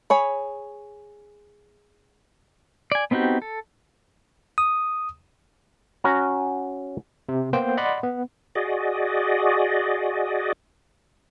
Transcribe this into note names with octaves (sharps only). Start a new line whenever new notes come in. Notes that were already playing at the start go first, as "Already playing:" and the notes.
G#4 C#5 B5
D5 G#5
B3 C4 D#4 F#4 G4
A4
D#6
C#4 F#4 A#5
C3
A#3 B3 C5 G5
D5 D#5 F#5 B5 C6
B3
F#4 G#4 D5 D#5